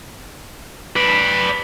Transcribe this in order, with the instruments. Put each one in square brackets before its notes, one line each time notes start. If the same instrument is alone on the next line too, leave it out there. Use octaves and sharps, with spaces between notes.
[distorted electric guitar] B4 D5